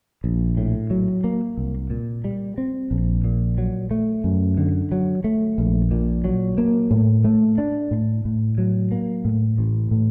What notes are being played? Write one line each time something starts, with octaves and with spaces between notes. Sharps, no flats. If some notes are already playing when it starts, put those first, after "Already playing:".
A#1
A2
F#3
A#3
C2
A#2
G3
C4
A#1
A#2
F#3
A3
F#2
D3
F#3
A3
A#1
A#2
F#3
A#3
A2
A3
D4
A2
A2
F#3
A#3
A2
A1
A2